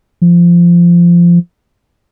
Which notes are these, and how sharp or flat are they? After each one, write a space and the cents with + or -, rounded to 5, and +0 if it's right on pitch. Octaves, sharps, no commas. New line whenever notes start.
F3 -15